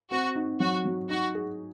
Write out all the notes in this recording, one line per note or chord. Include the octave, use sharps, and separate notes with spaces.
C4 F#4
D#4
F#3 F#4
F#3
D#4 F#4
G#4